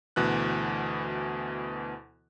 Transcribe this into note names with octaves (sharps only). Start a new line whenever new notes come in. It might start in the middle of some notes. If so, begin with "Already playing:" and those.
D2 B2 E3 F#6